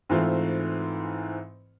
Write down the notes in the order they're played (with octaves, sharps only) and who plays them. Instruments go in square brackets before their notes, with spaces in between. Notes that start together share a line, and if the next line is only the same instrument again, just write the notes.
[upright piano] G#2 E3 A3 C4 F4